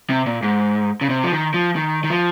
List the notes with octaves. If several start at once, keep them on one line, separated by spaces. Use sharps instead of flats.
C3
A#2
G#2
C#3
C3
F3
D#3
F3
D#3
D#3
F3